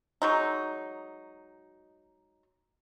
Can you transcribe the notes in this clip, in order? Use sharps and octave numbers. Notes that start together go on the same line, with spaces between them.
F#3 G#3 D#4